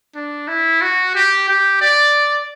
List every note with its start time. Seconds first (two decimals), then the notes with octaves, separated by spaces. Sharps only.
0.15 D4
0.48 E4
0.81 F#4
1.15 G4
1.48 G4
1.81 D5